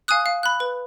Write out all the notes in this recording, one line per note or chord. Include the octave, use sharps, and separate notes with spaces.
F5 G#5 D#6 F#6
F5
B5 F#6
B4